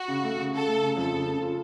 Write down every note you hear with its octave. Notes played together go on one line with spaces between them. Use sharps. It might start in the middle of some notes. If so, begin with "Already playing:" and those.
Already playing: F#4
C#3
A3
C#3
C#3 A4
A3
C#3
F2 A4
C#3
C#3
F4